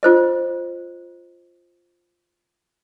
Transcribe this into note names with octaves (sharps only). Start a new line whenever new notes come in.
F4 C5 D#5